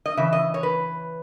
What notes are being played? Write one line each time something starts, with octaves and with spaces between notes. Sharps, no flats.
D#5
C#3 E3 E5
D#5
C#5
B4